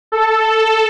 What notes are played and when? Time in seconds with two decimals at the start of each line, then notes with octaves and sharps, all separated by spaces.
0.12 A4